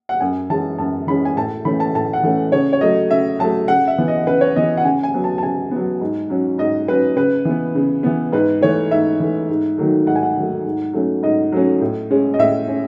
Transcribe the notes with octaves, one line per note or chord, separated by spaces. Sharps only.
F#5
F#2 G#5
E3 G#3 C#4 A5
F#2 A5
E3 G#3 C#4 B5
G#5
A2 A5
E3 A3 C#4 B5
A5
A2 A5
F#5
E3 A3 C#4
C#3 C#5
C#5
F#3 A3 D#5
C#3 E5
F#3 A3 A5
C#3 F#5
E5
E3 B3
D#5
C#3 B4
C#5
E3 B3 D#5
F#5
C#3 G#5
G#5
F#3 B3
A5
A5
C#3 G#5
F#3 B3
G#2
F#3 C#4
G#2 D#5
F#3 C#4 B4
C#3 B4
E3 B3
C#3
E3 B3
G#2 B4
E3 A3 C#5
G#2 E5
E3 A3
G#2
D#3 F#3 A3
G#2 F#5
G#5
F#5
D#3 F#3 A3
G#2
F#3 A3 C#4
G#2 D#5
F#3 A3 C#4
A2
G#3 C#4
D#5
A2 E5
C#4